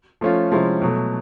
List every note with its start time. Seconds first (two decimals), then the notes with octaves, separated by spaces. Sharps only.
0.21 F3 A3 C#4 F4
0.51 C3 F3 G#3 C#4 E4
0.82 B2 F#3 A3